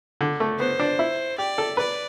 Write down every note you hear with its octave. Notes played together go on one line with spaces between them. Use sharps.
D3
A3
B3 C5
D4
E4
G4 D5
A4
B4 D5